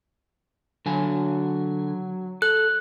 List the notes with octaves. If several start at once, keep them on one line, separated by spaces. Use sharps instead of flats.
D3 F#3 G#5
A4 F#6